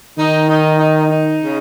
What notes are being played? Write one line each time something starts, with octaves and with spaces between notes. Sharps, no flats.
D#3 D#4
D#4
D#4
D#4
C#3